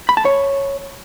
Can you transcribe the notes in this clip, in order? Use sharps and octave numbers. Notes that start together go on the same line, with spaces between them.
B5
A5
C#5